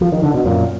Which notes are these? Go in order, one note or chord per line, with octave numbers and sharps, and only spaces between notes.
F3
D#3
D3
B2
F#2 A#2